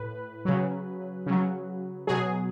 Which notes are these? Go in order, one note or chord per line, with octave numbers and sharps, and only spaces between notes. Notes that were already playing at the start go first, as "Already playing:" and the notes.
Already playing: A2 B4
C#3 F#3
C#3 F#3
B2 F#3 G#4